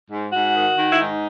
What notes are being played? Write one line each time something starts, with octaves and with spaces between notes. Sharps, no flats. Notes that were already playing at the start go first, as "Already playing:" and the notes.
G#2
G#2 F#4
D#3
D#3
E4
G#2 D#4